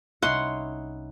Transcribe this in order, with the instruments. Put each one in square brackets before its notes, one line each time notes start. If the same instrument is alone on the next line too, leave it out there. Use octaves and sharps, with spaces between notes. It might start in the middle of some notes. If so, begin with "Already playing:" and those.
[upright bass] C2 [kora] C#4 D#4 E4 [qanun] F#5 C6